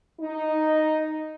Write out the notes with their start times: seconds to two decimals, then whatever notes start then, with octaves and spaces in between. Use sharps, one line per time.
0.20 D#4